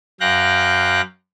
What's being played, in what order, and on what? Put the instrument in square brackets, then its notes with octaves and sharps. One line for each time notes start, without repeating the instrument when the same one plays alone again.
[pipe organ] F#2 F5 G5 F#6 A#6